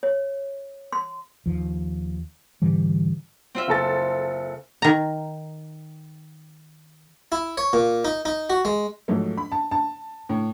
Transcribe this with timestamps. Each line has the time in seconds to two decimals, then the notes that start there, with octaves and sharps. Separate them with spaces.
0.03 C#5
0.92 C6
1.46 D#2 F3
2.62 G#2 D3 E3 G3
3.55 C4 F4 E5
3.68 F#1 A4 A6
4.82 D#3 A#5
7.32 E4
7.57 C#5
7.73 A#2
8.05 D#4
8.25 D#4
8.50 F#4
8.65 G#3
9.08 G#2 F3 F#3 A3
9.37 B5
9.52 A5
9.71 A5
10.29 A2